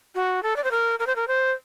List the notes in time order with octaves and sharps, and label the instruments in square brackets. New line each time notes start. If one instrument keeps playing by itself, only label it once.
[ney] F#4
A4
D5
C5
A#4
A#4
C5
A#4
C5